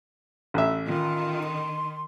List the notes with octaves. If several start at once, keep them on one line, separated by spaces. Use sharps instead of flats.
A1 E5
D#3 F4
C6